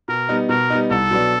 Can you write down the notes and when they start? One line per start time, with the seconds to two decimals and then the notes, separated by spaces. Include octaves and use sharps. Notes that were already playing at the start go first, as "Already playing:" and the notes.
0.08 B2 A#4
0.29 G3 B3 D#4
0.49 B2 A#4
0.70 G3 B3 D#4
0.91 C2 A4
1.11 B2 F#3 B3 D4